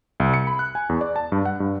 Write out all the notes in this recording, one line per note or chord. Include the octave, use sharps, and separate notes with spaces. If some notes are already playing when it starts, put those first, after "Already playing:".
C2
C#7
B5
F#6
G#5
E2
D5
A5
G2
F#5
G2